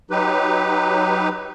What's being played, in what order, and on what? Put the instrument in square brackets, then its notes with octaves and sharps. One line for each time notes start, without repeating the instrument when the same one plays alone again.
[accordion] F#3 D#4 G4 B4